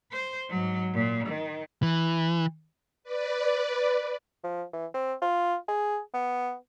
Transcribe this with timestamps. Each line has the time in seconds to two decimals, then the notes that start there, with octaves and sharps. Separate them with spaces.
0.11 C5
0.49 G#2 F#3
0.93 A#2
1.27 D#3
1.83 E3
3.04 B4 D5
4.43 F3
4.73 E3
4.94 C4
5.22 F4
5.68 G#4
6.14 B3